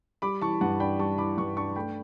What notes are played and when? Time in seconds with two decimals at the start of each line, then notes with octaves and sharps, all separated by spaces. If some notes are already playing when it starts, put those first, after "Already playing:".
0.22 G3 B5 D6
0.41 E3 A5 C#6
0.61 G2 F#5 A5
0.80 D4 G5 B5
0.99 G3 A5 C#6
1.18 E3 B5 D6
1.37 G2 A5 C#6
1.57 D4 A5 C#6
1.76 A3 G5 B5